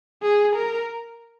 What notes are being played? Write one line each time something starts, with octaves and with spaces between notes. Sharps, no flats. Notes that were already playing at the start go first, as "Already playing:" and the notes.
G#4
A#4